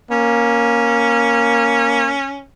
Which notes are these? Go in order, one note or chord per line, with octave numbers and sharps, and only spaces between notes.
A#3 C#4